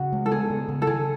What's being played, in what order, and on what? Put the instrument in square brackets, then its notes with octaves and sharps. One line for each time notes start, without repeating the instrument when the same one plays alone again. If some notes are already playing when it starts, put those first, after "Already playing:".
Already playing: [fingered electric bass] C#3 [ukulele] F#4
[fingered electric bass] G#3
[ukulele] A4
[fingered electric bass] B3 [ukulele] G#4
[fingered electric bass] C#3
C#3
[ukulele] A4
[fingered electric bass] D#3 [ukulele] G#4